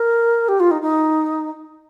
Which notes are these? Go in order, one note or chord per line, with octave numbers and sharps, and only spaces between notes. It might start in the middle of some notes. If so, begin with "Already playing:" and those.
Already playing: A#4
G4
F4
D#4
D#4